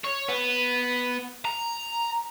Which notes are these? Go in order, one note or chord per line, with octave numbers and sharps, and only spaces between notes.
C#5
B3
A#5